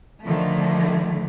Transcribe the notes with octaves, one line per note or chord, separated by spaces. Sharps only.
D3 D#3 F3 A3